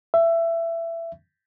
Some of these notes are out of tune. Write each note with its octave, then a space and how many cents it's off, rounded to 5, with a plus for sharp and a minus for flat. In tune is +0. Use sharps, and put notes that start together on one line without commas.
E5 +20